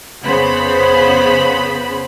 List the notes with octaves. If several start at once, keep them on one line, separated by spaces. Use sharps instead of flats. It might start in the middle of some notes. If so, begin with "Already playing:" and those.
F2 C#3 B3 C5 B5